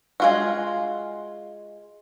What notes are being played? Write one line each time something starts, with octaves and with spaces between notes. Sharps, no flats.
G#3 F4 F#4